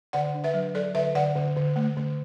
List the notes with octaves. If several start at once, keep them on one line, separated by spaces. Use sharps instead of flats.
D3 D5 F#5
D4
B4 E5
F#3
F#3 A4 D5
D3 B4 E5
D3 D5 F#5
D3
D3
A3
D3